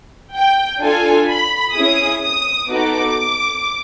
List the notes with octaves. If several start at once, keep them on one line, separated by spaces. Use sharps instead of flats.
G5
D4 F4 A4 G#5
B5
C#4 E4 G#4 D#6
D#6
B3 D#4 F#4 A4 D6